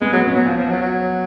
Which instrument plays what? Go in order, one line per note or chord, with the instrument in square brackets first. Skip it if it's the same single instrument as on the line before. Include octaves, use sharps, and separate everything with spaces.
[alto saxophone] G#3 [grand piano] B3
[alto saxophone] F#3
[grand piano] B3
B3
[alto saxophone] F#3 [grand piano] C#4
[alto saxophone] F3
F3
F#3
F#3